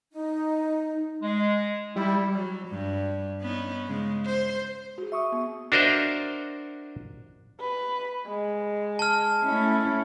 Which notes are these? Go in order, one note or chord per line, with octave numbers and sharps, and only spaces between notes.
D#4
G#3
G3 E4
F#3
G2
B3 C#4 D#4
C#3 G#3
C5
F#4 G#4
E5 C#6 D#6
B3
D4 F#4 A#4 C5 D#5 E5
B4
G#3
A5 F6
A3 C#4 E4